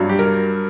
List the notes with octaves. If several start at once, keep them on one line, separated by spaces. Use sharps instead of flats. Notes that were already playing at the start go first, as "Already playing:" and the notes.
Already playing: G2 F#3
G4
A#4